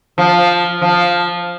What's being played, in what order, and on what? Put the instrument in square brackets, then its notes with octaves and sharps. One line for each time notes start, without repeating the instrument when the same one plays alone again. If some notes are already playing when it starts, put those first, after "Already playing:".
[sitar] F3
F3